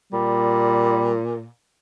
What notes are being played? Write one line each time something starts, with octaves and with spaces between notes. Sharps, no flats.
A#2 G3